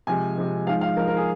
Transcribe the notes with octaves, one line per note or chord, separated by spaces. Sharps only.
C3 F3 G#3 G#5
C3 F3 G#3
G#2 F3 G#3 F5
F5
G#2 F3 G#3 A#4
A#4
G#4